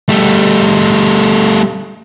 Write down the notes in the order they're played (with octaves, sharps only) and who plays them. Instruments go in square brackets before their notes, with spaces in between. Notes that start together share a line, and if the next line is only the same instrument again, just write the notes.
[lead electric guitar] G3 A3